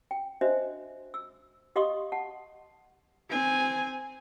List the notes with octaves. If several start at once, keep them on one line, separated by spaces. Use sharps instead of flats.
G5
D4 F#4 C5 D#5 E5
E6
G4 D#5 F5 C6 C#6 D#6
F#5 A5
C4 G#5